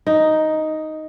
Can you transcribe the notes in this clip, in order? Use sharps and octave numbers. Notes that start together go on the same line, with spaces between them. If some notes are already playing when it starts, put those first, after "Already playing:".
D#4